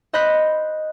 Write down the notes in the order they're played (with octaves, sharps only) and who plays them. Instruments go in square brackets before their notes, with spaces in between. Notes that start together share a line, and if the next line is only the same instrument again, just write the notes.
[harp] C5 D#5 B5 F#6 G6 B6